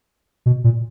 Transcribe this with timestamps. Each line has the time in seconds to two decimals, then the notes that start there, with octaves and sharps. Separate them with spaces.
0.46 B2
0.64 A#2